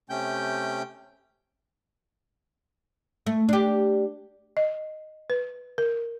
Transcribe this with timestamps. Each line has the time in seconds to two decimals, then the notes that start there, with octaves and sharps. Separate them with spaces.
0.09 C3 A3 C#4 G5 G6
3.26 A3
3.49 D4 G4
4.57 D#5
5.30 B4
5.78 A#4